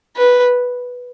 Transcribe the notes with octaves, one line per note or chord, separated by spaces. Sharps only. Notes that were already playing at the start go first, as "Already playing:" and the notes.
B4